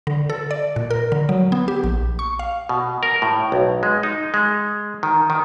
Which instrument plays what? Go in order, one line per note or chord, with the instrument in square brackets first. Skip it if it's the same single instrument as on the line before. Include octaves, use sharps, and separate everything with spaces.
[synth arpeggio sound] D3
A4
D5
A#2
A#4
D3
F#3
B3
G4
A#1
C#6
F5
[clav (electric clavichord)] B2
A#4
A2
B1
G#3
D#4
G#3
D#3
D#3